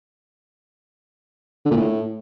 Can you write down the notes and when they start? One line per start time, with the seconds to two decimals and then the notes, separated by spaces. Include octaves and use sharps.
1.66 D3
1.71 A#2
1.77 A2